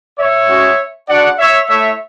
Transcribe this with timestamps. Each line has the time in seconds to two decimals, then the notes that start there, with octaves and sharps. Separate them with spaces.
0.17 C#5 E5
0.48 G#3 C#4 F#4
1.08 G#3 D4 F#4 D5 F#5
1.38 C#5 E5
1.69 A3 E4 C#5 E5